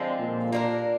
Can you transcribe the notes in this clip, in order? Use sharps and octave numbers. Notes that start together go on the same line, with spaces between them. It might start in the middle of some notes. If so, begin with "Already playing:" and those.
Already playing: D3 F3 G#3 C4
A#2
A#3 D4 G4 A#4